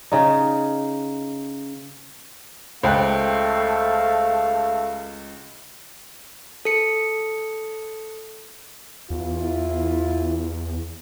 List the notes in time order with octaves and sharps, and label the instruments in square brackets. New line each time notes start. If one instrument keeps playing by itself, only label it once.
[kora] C#3 D#4
[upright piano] C#2 F#6 [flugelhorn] A3 [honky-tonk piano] C5 G5 [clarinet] F5
[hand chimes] A4 C#7
[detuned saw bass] E2 [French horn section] E4 F4